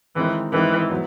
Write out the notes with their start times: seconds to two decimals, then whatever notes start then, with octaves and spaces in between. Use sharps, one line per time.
0.16 D#3 E3 G#3 C4 D#4
0.52 D#3 E3 G#3 C4 D#4
0.90 F#3 B3